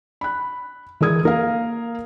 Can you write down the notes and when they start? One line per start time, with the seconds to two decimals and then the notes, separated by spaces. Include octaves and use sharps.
0.21 B5 F#6
1.01 E3 G#3 A#4 D#6 G#6
1.23 A#3 A#4 F5